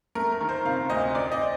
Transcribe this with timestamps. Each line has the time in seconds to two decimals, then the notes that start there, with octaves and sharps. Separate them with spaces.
0.15 A3 A#4
0.32 A#4
0.40 D#3
0.49 C5
0.65 C3 F5
0.90 D2 D#5
1.14 C4 D5
1.32 D#5